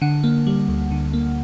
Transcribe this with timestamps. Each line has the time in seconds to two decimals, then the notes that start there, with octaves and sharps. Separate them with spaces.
0.02 D3 F#5
0.24 A#3
0.47 G3
0.69 D2
0.91 D3
1.14 A#3